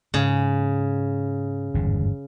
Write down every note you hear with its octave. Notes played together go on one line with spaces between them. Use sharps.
G#2 C#3
G1 E2 G#2